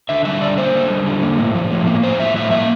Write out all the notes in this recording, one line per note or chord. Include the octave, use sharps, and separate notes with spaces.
D3 E5
G3 E5
D3 D5
A#3 C5
D3
G3
D3
A#3
A2
F3
A2
A#3
A2 C5
F3 E5
A2 E5
A#3 E5